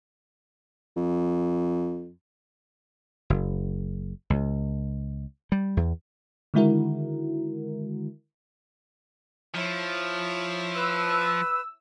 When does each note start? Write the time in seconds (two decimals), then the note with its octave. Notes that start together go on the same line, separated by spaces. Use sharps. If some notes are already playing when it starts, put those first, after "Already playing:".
0.96 F2
3.30 F#1
4.30 C#2
5.52 G3
5.77 E2
6.54 D3 D#3 G#3 E4 F#4 A#4
9.54 F3 E4 C#5
10.75 B4 E6